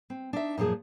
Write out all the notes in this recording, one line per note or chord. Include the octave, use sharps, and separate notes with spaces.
C4
D4 D#4 E5
F#2 A#2 F3 G#4 A5